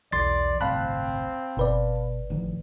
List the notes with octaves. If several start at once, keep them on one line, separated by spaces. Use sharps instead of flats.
B1 E2 D5 C6 A6
G1 C2 A2 C4 F5 A5 B5 F#6
G1 B2 B4 D5
A1 D#3 F3